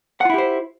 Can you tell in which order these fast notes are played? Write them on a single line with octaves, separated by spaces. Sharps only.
F#5 F4 E4 G4 C5